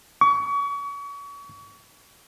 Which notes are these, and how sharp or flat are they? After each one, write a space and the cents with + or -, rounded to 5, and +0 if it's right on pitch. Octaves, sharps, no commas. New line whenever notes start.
C#6 +35